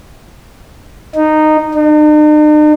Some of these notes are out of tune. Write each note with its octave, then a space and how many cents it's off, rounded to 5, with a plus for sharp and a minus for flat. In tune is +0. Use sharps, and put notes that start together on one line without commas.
D#4 -10
D#4 -45